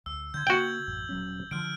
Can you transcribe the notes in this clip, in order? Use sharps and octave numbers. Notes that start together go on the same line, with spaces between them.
D2 E6
D3 G6 G#6
C#3 A#3 F#4 G5 F#7
A1 F#2
D#1 F#3 C#4
D3 F3 F6 D7